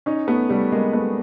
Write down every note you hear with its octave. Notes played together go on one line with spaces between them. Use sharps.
C#4 D#4
A3 B3
G3 A3
G#3 A#3
A3 B3